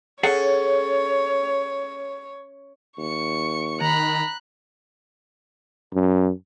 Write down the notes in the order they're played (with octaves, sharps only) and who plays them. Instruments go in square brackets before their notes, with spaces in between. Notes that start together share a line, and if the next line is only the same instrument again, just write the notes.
[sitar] C#4 [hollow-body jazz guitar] G#4 A4 F#5 [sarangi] C#5
[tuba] D#2 [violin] C#6 C#7
[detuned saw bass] D#3 [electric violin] A#5 B5 [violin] F#6
[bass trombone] F#2